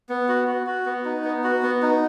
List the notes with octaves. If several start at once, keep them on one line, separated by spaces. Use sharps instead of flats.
B3
F#4
F#4
F#4
B3
D#4
B3
F#4
B3
D#4